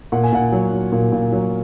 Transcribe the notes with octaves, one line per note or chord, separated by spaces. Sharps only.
A#2 F#5
G#5
A#2 F#5
F#3
F#3
A#2
A#2
F#3